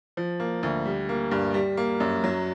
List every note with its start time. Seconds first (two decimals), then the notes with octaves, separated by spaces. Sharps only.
0.17 F3
0.40 A#3
0.63 D2
0.86 G3
1.09 A#3
1.31 G2
1.54 G3
1.77 A#3
2.00 F#2
2.24 F#3